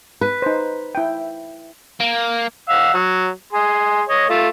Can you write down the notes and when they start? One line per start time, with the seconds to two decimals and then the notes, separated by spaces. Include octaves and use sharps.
0.21 B4
0.42 D#4 C5
0.95 E4 G5
2.00 A#3
2.69 F5 F#5 E6
2.94 F#3
3.53 G#4 C6
4.09 C#5 D#5
4.29 A3 F4